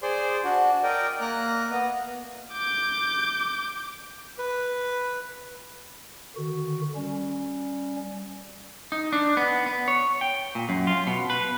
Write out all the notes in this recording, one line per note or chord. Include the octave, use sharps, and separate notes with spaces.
G#4 C5 D5 C6
D4 F#4
A#4 D5 D#5 G5
A#3 A#5 F#6
B3 D#5
D6 G6
B4
D3 D#3 F#4
G3 C#4
D#4
D4
B3
B3
C#5
G5
A#2
F#2
F4
B2
B4